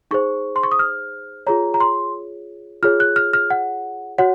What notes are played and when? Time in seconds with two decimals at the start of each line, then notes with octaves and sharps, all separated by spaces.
0.11 D#4 G#4 C5 C#6
0.56 C6
0.63 C#6
0.72 D#6
0.79 F6
1.47 F4 G#4 C#5 A#5
1.74 A#5
1.80 C6
2.83 F4 G#4 C#5 F6
3.00 F#6
3.16 F6
3.33 F6
3.50 F#5
4.18 F#4 C#5 F#5